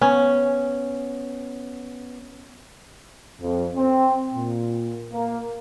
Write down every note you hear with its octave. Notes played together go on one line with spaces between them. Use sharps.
B3 C#4
F2
C4
A#2
A#3